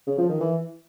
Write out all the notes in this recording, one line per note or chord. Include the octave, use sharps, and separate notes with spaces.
C#3
F3
D#3
E3